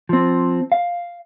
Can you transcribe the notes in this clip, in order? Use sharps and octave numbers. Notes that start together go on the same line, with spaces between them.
F3 C4
F5